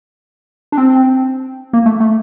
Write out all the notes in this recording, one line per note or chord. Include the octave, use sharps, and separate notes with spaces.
D4
C4
A#3
A3
A3